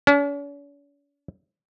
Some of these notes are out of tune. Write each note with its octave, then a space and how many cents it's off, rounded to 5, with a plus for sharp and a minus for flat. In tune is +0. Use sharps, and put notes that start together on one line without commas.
C#4 +45